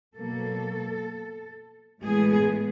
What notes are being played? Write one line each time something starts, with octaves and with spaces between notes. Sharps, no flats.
B2 F#3 A#3 A4
A2 E3 G#3 B3 G#4